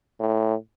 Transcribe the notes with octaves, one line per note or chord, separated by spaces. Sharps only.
A2